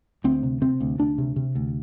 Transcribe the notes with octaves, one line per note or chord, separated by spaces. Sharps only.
D2 C4
C3
C3 C4
D2
D2 D4
C3
C3
D2